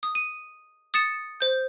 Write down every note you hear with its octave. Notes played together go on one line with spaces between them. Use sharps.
D#6
D#7
D#6 A6 C#7 E7
C5 G6